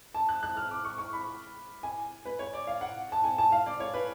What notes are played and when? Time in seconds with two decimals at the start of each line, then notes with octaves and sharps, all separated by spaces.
0.14 A5
0.29 F#6
0.43 F#6
0.57 F6
0.71 D6
0.85 C#6
0.98 C#6
1.13 B5
1.83 G#5
2.25 B4
2.39 C#5
2.53 D5
2.67 F5
2.81 F#5
3.12 A5
3.24 G#5
3.38 A5
3.52 F5
3.66 D5
3.80 C#5
3.94 B4